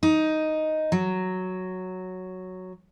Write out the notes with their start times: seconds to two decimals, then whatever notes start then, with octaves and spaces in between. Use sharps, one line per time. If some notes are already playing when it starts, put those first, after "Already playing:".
0.03 D#4
0.92 F#3